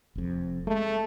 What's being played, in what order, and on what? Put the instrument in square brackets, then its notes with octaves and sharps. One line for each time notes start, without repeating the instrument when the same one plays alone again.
[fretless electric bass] F1 F2
[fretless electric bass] G#3 [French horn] A3